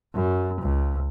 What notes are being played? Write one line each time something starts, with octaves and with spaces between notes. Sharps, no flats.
F#2
C#2